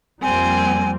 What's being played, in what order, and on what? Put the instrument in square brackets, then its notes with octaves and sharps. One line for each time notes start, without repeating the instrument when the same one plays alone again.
[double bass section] F2 G3 A#3 [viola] C4 [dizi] G#5